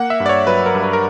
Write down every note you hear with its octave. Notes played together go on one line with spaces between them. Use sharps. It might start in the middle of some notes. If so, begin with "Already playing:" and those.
Already playing: A#3 F#5
E5
G2
D5
C#5
F#3 B4
A#4
G2
B4
A#4